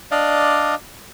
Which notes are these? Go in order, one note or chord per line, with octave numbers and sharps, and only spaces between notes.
D4 D5 D#5 F5